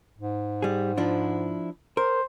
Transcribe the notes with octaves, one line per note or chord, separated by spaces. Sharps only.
G#2
G3 G#4
F3 D4 E4
A#4 C5